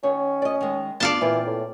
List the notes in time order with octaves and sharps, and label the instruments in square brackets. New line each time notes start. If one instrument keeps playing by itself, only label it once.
[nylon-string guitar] D#3 C#5 [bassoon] C#4
[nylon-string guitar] D5 D#5
D#3 G#3
[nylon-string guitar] B3 D4 F4 [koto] D5 F5 A5
[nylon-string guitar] A#2 C4 F4 [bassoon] E3
[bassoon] A2